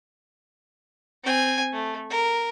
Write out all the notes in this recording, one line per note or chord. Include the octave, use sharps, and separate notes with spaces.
C4 G#5
A3
A#4